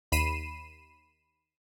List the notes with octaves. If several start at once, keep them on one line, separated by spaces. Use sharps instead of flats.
D#2 B5 C7 D#7 E7